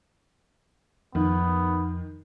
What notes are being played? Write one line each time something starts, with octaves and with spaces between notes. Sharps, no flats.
F2 D#3 B3